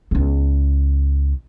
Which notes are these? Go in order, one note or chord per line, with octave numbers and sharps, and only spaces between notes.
C#2 B3